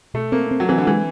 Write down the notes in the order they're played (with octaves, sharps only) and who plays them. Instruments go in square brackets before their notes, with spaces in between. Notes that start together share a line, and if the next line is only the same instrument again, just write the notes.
[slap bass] B2 [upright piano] A3
[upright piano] A#3 [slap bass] C4
[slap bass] C4
[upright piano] F#3
[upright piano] E3 [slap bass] C4
[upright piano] D3
[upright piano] E3 [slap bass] G#3